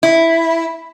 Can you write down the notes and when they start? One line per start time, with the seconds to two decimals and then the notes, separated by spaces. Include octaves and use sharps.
0.03 E4